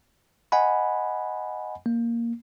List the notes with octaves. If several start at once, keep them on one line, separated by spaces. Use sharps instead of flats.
D#5 F#5 G#5 B5
A#3